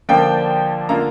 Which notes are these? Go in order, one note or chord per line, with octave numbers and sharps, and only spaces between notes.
D3 F3 A#3 D4 G5
D3 A#3 F4 A#5